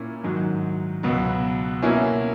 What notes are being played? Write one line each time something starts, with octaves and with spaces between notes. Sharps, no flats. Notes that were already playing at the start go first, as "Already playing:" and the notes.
Already playing: A#2 A#3 C#4 E4
G#2 D#3 F#3
C#2 B2 F#3 B3
B2 A#3 C#4 E4